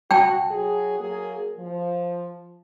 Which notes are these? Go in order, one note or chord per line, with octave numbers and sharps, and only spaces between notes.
F#4 G5 A5
F#3 F#4 G#4
F#3 A#3 G#4
F3